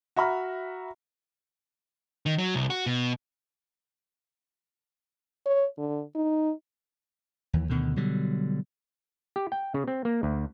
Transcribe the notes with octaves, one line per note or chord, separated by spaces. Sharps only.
F#4 E5 A#5 B5 F6
D#3
F#3
C2
F#4
B2
C#5
D3
D#4
D#2 E3
D2 B2 D3 D#3
B2 D3 F#3 G3
G4
G5
C#3
C4
A#3
D2